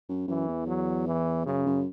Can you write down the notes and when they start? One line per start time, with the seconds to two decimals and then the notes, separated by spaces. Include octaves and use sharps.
0.09 F#2
0.28 F#2 E3
0.48 E2
0.67 F#3
1.08 E3
1.46 F#2 C#3
1.66 F#2